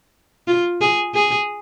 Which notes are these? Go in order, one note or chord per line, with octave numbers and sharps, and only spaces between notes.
F4
G#4
G#4